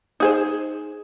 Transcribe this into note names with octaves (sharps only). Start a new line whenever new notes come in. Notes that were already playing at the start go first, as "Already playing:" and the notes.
D#4 G#4 C5